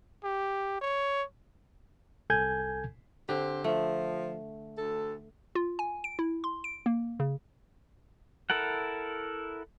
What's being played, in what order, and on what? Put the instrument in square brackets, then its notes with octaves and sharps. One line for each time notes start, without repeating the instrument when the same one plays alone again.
[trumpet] G4
C#5
[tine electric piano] C2 A4 G#5 G6 G#6
[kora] D3 [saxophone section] C4 G4 C5
[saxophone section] F3 [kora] A3
[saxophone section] D2 A4
[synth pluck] F4
G#5
D7
E4
C6
D7
A#3
C#3
[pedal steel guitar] E4 A4 A#4 F#5